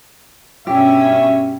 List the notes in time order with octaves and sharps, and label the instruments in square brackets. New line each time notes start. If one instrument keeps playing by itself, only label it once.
[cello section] G2 B2 C#4 [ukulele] G4 [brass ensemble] E5